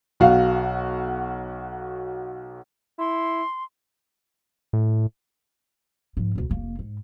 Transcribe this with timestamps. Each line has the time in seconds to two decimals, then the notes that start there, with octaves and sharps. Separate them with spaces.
0.20 B1 F#4 F5
2.99 E4 C6
4.73 A2
6.17 G#2 F3
6.35 E1 D2
6.50 F1 A#3
6.79 G#2